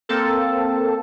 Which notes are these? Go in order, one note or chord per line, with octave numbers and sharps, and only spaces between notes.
A#3 C4 A4